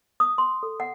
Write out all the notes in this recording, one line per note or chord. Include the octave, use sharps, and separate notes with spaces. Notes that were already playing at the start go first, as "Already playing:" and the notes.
D#6
C6
A4
F#5